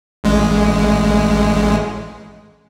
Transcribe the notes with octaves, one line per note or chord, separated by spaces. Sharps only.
A1 G#3